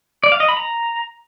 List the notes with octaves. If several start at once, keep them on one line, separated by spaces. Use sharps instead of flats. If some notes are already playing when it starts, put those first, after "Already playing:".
D5
F5
D#5
B5
A#5